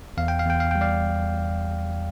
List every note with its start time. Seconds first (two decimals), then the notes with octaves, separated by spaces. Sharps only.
0.17 E2 F5
0.28 G5
0.39 F5
0.46 E2 G5
0.60 F5
0.71 G3 G5
0.81 D5 F5